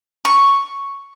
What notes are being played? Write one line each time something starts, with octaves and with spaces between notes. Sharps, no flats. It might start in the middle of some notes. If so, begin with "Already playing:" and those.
C#6